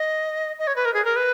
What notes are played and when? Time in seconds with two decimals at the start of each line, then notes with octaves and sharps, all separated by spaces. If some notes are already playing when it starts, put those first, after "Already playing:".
Already playing: D#5
0.59 D#5
0.67 C#5
0.76 B4
0.85 A#4
0.94 G#4
1.05 A#4
1.16 B4